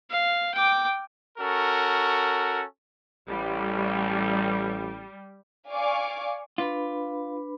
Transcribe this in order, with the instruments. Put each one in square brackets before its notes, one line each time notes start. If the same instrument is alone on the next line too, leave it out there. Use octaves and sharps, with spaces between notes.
[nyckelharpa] F5
G5 D6
[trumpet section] C#4 F#4 A4 A#4
[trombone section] A1 [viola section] G3
[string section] D5 F5 G#5 C#6 D6
[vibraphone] D4 B4 B5 [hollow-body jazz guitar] F4